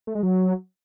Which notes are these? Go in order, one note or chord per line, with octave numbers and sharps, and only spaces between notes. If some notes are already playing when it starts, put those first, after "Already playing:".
A3
G#3
F#3